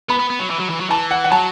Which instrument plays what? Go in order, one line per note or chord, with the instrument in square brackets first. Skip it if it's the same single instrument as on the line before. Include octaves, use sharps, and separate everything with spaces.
[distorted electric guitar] B3 [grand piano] B5
[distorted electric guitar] B3
B3
F#3
E3
F#3
E3
F#3
[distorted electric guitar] E3 [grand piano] A5
[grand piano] F#5
F#5
[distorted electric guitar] F#3 [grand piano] A5